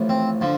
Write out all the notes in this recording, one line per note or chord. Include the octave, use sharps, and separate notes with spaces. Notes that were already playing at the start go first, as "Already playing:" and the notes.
Already playing: A1 A2 F3
C4
D3 F3